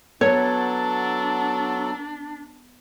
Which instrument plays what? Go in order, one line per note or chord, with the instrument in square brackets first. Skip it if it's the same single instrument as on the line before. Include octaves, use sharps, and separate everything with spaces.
[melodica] F#3 A4 [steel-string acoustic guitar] B3 [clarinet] D4 [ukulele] C#5